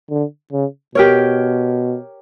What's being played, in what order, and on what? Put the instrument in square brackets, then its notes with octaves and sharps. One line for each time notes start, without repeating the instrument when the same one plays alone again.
[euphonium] D3
C#3
[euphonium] B2 [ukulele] G4 A#4 C#5